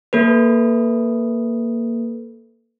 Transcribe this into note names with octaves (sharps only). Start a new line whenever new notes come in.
A#3 A4 B4